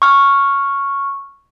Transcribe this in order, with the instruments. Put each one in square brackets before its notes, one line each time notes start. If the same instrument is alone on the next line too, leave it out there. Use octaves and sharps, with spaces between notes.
[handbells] C#6 F6